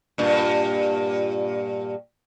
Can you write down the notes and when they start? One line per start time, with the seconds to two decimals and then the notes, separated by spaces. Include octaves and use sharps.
0.18 G2 A#2